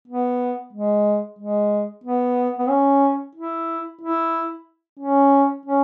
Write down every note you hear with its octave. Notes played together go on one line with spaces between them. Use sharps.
B3
G#3
G#3
B3
B3
C#4
E4
E4
C#4
C#4